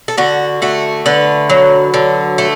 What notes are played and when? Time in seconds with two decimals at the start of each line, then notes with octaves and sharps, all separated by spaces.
0.08 A4
0.17 D3 F#4
0.62 A3 F#4
1.06 D3 B4
1.50 F#3
1.94 D3
2.38 A3